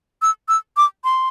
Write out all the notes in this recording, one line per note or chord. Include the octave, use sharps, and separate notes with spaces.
E6
E6
D6
C6